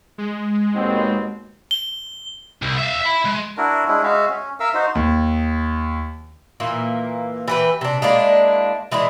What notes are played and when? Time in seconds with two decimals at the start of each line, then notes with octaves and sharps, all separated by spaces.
0.18 G#3
0.75 D#2 B2 C4
1.71 G7
2.62 C2
2.77 E5 F5
3.01 E5 B5
3.25 G#3
3.57 D4 E4 F#4 A#4
3.88 G#3 C#4 D4 E4
4.03 G#3 F#4 E5 F5
4.30 C#4
4.60 A#4 E5 F5 E6
4.74 D#4 F#4 C5
4.95 D#2
6.60 A#2 E3 A#3
7.48 E3 G4 B4
7.81 C3 D4
8.02 G#3 A#3 D4 E4
8.92 E3 G#3 D4 E4